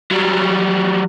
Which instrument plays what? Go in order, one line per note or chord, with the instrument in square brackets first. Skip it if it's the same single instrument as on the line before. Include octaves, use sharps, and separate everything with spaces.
[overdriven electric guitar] F#3 G3